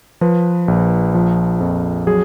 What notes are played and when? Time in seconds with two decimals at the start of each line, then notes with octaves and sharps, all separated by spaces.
0.21 F3 B4
0.68 A#1
1.14 F3
1.61 F2
2.07 F#3 G#4